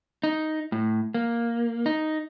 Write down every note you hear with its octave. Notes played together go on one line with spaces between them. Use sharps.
D#4
A2
A#3
D#4